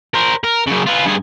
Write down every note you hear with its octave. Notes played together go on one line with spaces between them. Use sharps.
A#4 C5
A#4
F#2 C#3
F4 B4
G2 G#4